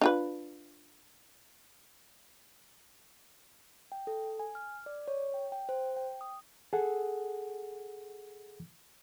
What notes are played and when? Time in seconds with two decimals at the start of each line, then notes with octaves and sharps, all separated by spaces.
0.01 D4 F4 B4
3.92 G5
4.07 A4
4.39 G#5
4.55 F6
4.86 D5
5.08 C#5
5.34 G5
5.52 G5
5.69 C5
5.96 G5
6.21 D#6
6.73 G#4 A4 F#5